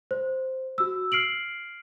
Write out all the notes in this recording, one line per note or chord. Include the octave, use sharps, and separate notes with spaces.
C5
F#4 E6
F6 C7 D7 F#7